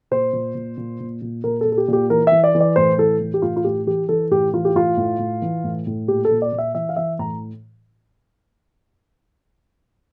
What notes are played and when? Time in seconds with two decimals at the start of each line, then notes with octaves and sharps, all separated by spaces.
0.11 A#2 C5
0.33 A#2
0.55 A#2
0.77 A#2
1.00 A#2
1.22 A#2
1.44 A#2 A#4
1.61 A4
1.65 A#2
1.72 A4
1.78 G4
1.88 A#2 G4
2.10 E3 A#4
2.27 E3 E5
2.44 D5
2.55 E3
2.60 D5
2.76 A2 C5
2.98 E3 A4
3.20 E3
3.34 G4
3.42 A2 F4
3.56 F4
3.64 A2 G4
3.86 E3 G4
4.09 E3 A4
4.31 A2 G4
4.53 E3 F4
4.65 G4
4.75 A2 F4
4.97 A2
5.19 A2
5.42 E3
5.64 A2
5.87 A2
6.08 A#2 G4
6.25 A4
6.31 A#2
6.42 D5
6.52 A#2
6.58 E5
6.74 E3 E5
6.89 F5
6.96 E3 E5
7.19 A2 A#5